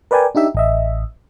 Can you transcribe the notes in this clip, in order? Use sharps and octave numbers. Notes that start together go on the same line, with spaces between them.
A#4 B4 D5 G5 G#5
D4 D#4 G4 E5
A1 D#5 E5